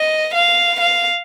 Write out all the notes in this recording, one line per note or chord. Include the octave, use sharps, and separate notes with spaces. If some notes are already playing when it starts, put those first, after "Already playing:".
Already playing: D#5
F5
F5